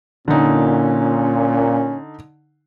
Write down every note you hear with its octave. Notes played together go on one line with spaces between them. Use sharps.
A#2 D3 C#4 D#4